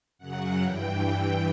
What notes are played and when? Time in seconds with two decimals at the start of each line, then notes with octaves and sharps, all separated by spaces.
0.18 F#2 C#3 F#3 F#5
0.61 G2 E3 G5